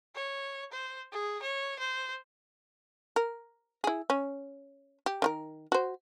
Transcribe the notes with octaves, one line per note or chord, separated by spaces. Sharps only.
C#5
C5
G#4
C#5
C5
A#4
E4 G#4
C#4
G4
D#3 F4 A#4
F#4 C5